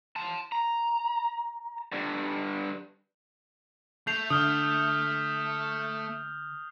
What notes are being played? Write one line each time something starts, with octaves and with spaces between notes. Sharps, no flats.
A5 C6
A#5
G2 D3
A3 G6 C7 F7
D3 D#6 F6 G6